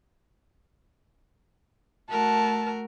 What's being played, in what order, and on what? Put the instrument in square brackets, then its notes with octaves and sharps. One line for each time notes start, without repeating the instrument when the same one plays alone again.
[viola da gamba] A3 F#4 A#4 [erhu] A5